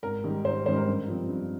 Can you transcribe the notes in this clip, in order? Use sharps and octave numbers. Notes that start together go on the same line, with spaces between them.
G#1 A#4
G#2 D#3 G3
G#1 C5
G#2 D#3 G3 C5
A#4
G2
F3 C4
G2